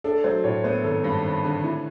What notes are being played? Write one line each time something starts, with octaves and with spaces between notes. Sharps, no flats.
D4 A4
F#3 C5
A2 C#5
B3 C5
G#1 A4
G2
G#1
D3
E3